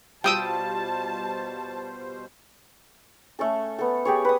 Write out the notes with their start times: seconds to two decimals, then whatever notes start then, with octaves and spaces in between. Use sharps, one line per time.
0.24 B2 G3 F4 C5 G5 A5 D#6 E6
3.39 A3 C#4 A4
3.79 B3 A4
4.05 G4 G#4 C#5
4.25 B4 D#6